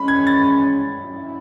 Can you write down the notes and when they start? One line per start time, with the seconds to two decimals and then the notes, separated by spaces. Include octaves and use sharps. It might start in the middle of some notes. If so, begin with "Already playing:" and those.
Already playing: E3 G#3 C#4 B5
0.08 G#6
0.27 A6
1.01 F#3 C#4 E4